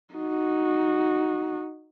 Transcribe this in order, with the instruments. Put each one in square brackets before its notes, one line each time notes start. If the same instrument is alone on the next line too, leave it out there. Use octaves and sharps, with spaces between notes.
[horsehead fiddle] D#4 F#4